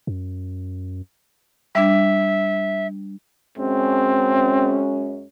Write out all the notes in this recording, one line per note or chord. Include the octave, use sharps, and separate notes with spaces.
F#2
G3 D4 E5
F#2 G#3 C4 C#4